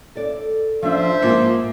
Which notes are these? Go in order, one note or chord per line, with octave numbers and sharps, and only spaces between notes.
A4 D5
F3 D4 C5 E5
G#2 A#3 F4 A5